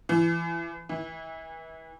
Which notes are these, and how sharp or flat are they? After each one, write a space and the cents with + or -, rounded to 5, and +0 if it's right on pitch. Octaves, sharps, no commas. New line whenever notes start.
E3 +25
E3 -35